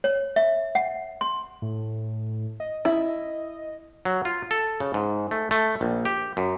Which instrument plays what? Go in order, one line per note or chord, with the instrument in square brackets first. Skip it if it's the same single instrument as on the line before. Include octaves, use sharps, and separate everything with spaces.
[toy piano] C#5
E5
F#5
C6
[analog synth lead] A2
D#5
[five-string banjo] E4
[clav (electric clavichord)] F#3
F4
A4
C#3
G#2
A3
A3
A#1
G4
F#2